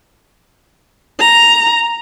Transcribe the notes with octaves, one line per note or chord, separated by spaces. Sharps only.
A#5